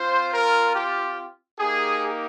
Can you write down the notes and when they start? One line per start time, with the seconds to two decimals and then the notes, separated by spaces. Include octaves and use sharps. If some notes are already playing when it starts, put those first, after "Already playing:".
Already playing: C4 F4 C5
0.31 A#4
0.73 G4
1.58 A#3 D#4 G4 G#4